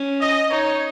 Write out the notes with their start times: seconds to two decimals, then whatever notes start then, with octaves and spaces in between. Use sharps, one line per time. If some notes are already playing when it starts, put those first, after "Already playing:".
Already playing: C#4
0.20 D#5
0.49 D#4 C#5